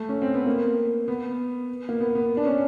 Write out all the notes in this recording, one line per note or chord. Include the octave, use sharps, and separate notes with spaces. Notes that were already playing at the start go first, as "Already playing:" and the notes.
Already playing: A3
C#4
C4
B3
A#3
B3
A#3
B3
B3
D4
C#4